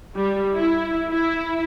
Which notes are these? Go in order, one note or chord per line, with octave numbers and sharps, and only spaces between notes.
G3
E4
E4